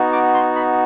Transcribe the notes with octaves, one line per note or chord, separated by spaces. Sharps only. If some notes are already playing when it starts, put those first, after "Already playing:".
Already playing: B3 D#4 F#4
D6
C6
B5